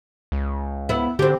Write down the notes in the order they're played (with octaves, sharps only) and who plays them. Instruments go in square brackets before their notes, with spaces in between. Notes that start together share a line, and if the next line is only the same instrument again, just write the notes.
[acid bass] C#2
[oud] B3 E4
[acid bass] D3 [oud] C4 G4